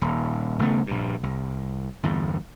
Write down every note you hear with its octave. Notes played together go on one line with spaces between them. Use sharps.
D#1
D#1 C#3 A3 B3
A#1 G2
C2
G1 E2